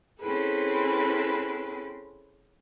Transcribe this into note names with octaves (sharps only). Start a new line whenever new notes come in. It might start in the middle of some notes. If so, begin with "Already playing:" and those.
C4 C#4 E4 G#4 A4 B4